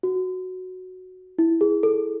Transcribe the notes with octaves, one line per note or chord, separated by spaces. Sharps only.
F#4
E4
G#4
A4